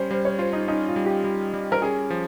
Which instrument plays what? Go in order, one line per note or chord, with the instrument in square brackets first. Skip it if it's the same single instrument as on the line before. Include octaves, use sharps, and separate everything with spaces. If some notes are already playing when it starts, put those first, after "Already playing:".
Already playing: [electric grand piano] G3 C#4 [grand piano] C5
[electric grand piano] G3 [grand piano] C5
[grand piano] C#5
[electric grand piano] F4 [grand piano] C5
[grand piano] D#4
[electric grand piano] C#4 [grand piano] D#4
[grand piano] F4
[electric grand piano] G3
[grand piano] G4
[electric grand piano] G3
G3
[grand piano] A#4
[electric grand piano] C#4 [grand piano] G#4
[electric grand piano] F3